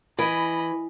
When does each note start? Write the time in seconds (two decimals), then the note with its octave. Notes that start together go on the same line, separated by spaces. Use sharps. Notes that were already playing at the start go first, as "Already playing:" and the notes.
0.19 E3 D#5 B5